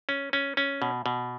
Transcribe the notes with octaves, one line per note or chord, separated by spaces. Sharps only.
C#4
C#4
C#4
B2
B2